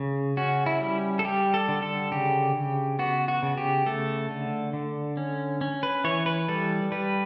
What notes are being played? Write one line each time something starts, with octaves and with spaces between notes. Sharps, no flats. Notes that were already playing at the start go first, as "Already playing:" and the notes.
Already playing: C#3
C#4 F#4
E4
G3
A4
G3 G4
A4
D3
A4
C#3 G4
C#3
B3 F#4
F#4
C#3
G4
A3 A4
D3
D3
C#4
C#4
B4
E3 C#5
B4
G3 A4
G3 B4